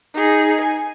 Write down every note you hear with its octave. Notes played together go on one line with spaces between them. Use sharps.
D#4 G#4
G#5